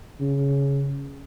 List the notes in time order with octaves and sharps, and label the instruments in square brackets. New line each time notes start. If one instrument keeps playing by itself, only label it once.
[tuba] C#3